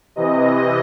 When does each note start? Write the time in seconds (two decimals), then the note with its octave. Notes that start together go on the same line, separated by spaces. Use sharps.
0.16 C3 E3 D#5